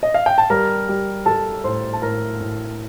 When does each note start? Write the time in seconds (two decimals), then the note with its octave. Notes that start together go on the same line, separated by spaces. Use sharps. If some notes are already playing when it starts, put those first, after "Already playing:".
0.03 D#5
0.14 F5
0.26 G5
0.38 A5
0.50 G3 A#4 A#5
0.89 G3
1.26 G3 A4 A5
1.64 A2 C5 C6
1.93 A5
2.02 A2 A#4 A#5
2.40 A2